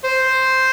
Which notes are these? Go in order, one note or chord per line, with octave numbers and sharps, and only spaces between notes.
C5